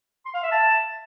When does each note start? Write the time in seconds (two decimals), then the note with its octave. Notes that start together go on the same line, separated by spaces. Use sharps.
0.25 C6
0.34 F5
0.43 E5
0.52 A5